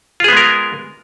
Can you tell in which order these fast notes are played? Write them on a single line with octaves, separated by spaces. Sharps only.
F4 G#4 B3 G#3 A#4